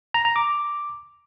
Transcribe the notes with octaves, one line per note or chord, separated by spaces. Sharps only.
A#5
A#5
D6